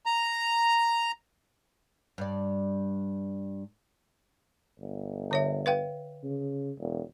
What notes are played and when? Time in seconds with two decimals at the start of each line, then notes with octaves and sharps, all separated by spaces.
0.06 A#5
2.18 G2 D5
4.79 G1
5.31 D3 C#5 E5
5.66 B4 F5 G5
6.24 C#3
6.79 E1